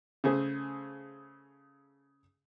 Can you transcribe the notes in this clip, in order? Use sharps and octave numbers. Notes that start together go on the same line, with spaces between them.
C#3 A3 G#4 C5